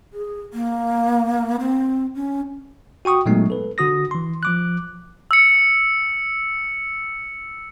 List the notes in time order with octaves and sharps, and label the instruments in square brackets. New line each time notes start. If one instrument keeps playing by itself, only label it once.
[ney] G#4
A#3
C4
C#4
[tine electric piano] F#4 G5 C#6 D#6
A#2 F#3 G#3 A3 B3 D#4
A4 B4
D3 F#4 D#6 A#6
E3 C6
F3 D6 F#6
[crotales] E6 C#7